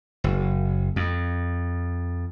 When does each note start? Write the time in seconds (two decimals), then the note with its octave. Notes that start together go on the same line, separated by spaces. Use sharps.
0.24 F#1
0.96 F2